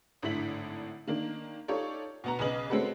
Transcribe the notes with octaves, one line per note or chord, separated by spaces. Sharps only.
G#1 A2 D3 E4 B6 F#7
D#3 A#3 D4
D#4 F4 G4 A4 C#5 D5
B2 B3 A#5
B1 C#3 G#4 B4 D#5 F#7
G#3 C4 C#4 F#4 A4 B4